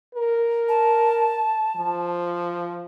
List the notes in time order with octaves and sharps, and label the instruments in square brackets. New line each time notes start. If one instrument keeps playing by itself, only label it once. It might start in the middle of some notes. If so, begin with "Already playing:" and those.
[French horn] A#4
[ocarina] A5
[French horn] F3